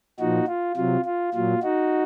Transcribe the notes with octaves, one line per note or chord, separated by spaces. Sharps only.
A#2 F3 D#4 F#4
F4
C3 F#3 F4
F4
A#2 F#3 F4
D#4 F#4